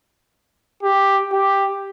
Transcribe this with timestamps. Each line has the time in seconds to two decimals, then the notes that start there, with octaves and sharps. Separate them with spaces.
0.83 G4
1.32 G4